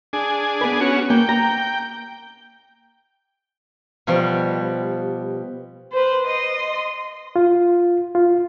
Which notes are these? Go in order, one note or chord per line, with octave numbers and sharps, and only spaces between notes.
D4 G#4
B3 B4
C#4 F#4
A#3 G5
A#5
B2 F3 G3
B4 C5
D#5 C6
F4
F4